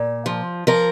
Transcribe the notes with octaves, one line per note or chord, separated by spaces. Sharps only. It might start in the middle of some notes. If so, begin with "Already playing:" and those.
Already playing: A#2
F3
F3 A#4